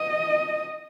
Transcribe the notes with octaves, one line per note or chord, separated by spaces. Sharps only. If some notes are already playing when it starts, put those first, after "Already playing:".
Already playing: D#5